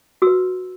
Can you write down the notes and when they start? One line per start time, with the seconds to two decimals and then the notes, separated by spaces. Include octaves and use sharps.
0.22 F#4 B4 E6